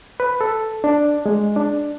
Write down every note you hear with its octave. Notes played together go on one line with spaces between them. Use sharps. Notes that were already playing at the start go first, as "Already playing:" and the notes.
B4
A4
D4
G#3
D4